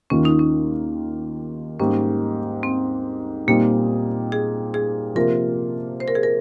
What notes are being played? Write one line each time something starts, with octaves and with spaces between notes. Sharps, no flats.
D#2 D#3 A#3 C#4 F4
D#4
C#4
G#2 G3 A#3 C#4 D#4
C4
A#2 G3 A#3 C4 D#4
G#4
G#4
C3 F3 A#3 F4 A#4
C5
A#4
G#4
A#4